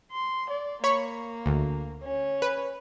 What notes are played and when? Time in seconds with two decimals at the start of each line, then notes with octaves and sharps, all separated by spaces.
0.11 C6
0.50 D5
0.84 A#3 C#5 B5 C#6
1.46 D2
2.03 C#4
2.42 B4